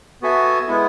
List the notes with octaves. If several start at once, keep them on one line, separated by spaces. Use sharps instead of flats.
B3 F#4 A4 E5 G#5
G#3 B3 E4